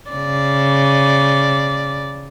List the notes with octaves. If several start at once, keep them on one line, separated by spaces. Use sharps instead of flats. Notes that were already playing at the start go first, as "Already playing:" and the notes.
C#3 D5